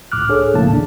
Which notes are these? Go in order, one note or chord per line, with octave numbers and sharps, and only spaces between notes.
G1 C#2 A2 D6 F6 F#6
D4 G#4 A4 C#5
A#1 A2 C#3 A#3 A5
D#2 D4